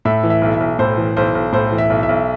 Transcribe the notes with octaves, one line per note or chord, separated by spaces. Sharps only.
A2 E5
E3
E5
B1
E5
B1
A2 C5
E3
B1 C5
B1
A2 C5
E3
E5
B1
E5
B1